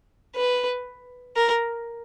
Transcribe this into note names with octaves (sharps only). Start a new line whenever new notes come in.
B4
A#4